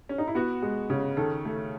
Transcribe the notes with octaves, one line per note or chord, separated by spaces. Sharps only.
C#4
D#4
E4
B3 F#4
G#3
C#3
D#3 A4
A3